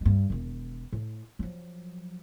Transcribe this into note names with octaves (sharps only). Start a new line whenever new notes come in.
G2 G#3
E1 D#3
A2
F3 F#3